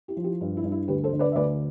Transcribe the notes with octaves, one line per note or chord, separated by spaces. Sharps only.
E4 G4
F3
E4 G4
G2
E4
G2
E4
D2 G4 B4
A4 C5
D3
B4 D5
E5
D2 B4 D5